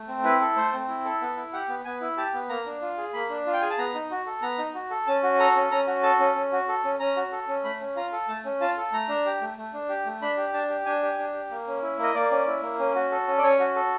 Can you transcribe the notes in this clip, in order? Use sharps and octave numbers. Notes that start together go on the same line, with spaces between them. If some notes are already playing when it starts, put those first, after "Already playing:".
Already playing: A3
C4
E4 B4
A4
A3 C5
C4
E4
A4
B3
E4
G4 F#5
B3
B3 G#5
E4
G4 A5
B3
A#3 A#5
D4
F4
G#4
A#3 B5
D4
F4
G5
G#4 G#5
A5
B3 A#5
D#4
F#4
A4
B3 A#5
D#4
F#4
A4
C#4 A5
F#4
A4 A#5
C#4
C#4 A#5
F#4
A4 A5
C#4
C#4
F#4
A4
C#4
C#4 A#5
F#4
A4
C#4
A3 B5
C#4
F4 A#5
A4
A3 A5
C#4
F4 A5
A4
A3 A#5
D4
G4
A3
A3
D4
G4
A3
D4 B5
G4
D4 A5
G4
D4 G#5
G4
D4
G4
A#3
C#4
E4
A#3
D#5
A#3 D5
C#4
E4
A#3
C#4
F#4
A4
C#4
D5
C#4 C#5
F#4
A4